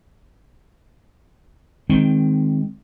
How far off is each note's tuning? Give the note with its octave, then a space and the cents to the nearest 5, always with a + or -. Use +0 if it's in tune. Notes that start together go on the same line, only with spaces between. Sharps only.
D#3 +0 G#3 +0 C4 +0